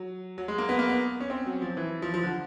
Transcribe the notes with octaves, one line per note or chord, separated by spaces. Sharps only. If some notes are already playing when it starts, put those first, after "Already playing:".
Already playing: F#3
F#3
G#3
A#3
B3
A#3
B3
C#4
C4
F#3
F3
E3
F3
F3
D3